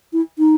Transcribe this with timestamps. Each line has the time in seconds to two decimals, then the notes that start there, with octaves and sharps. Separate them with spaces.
0.13 E4
0.38 D#4